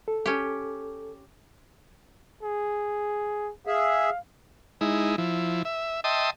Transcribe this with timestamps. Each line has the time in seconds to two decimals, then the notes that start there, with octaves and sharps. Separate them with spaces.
0.08 A4
0.26 C#4 G4
2.43 G#4
3.67 G#4 E5 F5
4.81 G#3 D#4 E4
5.18 F3 E4
5.65 E5
6.04 D#5 E5 G5 A5 C6 D#6